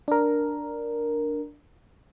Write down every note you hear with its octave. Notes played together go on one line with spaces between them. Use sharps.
D4 A#4